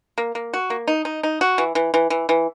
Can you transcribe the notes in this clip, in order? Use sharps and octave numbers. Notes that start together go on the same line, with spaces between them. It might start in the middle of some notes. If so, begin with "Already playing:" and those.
A#3
A#3
F#4
A#3
D#4
D#4
D#4
F#4
E3
E3
E3
E3
E3